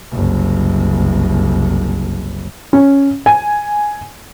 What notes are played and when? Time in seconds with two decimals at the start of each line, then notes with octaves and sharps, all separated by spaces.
0.12 F#1 C2
2.73 C#4
3.26 G#5